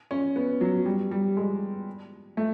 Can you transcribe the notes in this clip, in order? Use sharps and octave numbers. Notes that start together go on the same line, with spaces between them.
C#4
B3
F#3
G3
G3
G#3
A3